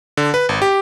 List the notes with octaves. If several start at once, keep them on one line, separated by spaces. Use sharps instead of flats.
D3
B4
G#1
G4